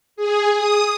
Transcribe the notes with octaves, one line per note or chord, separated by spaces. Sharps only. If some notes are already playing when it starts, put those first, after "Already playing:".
G#4
D#6